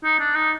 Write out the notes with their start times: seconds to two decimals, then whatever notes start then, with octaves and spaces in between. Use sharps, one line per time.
0.04 D#4
0.20 D4
0.35 D#4